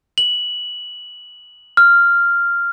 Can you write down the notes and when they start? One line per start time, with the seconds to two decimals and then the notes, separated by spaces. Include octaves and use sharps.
0.18 F#7
1.77 F6